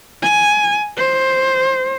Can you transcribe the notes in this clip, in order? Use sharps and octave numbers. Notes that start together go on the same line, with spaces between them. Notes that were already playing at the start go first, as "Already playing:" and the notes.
G#5
C5